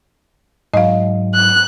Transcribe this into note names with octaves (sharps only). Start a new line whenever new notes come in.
G#2 F#3 D#5 F5
F#6